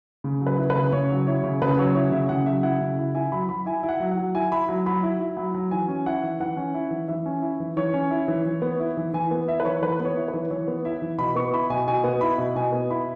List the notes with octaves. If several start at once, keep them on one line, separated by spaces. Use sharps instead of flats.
C#3
F#3
B4
E4
B4
C#3
C#3 C#5
F#3
E4 C#5
C#3
C#3 B4
F#3 C#5
E4 C#5
C#3 E5
C#3 F#5
F#3 E5
E4 F#5
C#3
E4
E4 G#5
F#3 B5
F#3 B5
E4 G#5
E4
F#5
F#3
F#5
F#3
E4 G#5
E4 B5
F#3
F#3 B5
E4
E4
F#3
F#3
E3 G#5
C#4
E4 F#5
E3
E3 F#5
C#4
E4
E3
E3 E5
C#4
E4
E3
E3 C#5
C#4
E4
E3
E3
B3
E4
E3
E3 G#5
B3
E4 E5
B4
E3 C#5
E3 B4
B3
C#5
E4
B4
E3
E3 C#5
B3
E4 E5
E3
B2 B5
B3 C#6
E4 B5
B2 G#5
B2 G#5
B3
E4 B5
B2
B2 G#5
B3
E4 B5